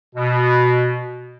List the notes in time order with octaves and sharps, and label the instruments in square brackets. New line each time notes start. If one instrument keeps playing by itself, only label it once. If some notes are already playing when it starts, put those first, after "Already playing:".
[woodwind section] B2